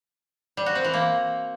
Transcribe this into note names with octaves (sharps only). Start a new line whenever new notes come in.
G3
F#4
C4
E3
A#3